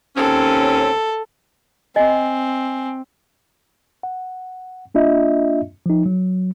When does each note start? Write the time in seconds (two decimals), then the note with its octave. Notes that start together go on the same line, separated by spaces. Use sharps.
0.17 D#2 C4 C#4 A4
1.96 C4 D#5 G#5
4.03 F#5
4.94 A#3 D4 F4 D#5 E5
5.86 F3 D#4
6.06 F#3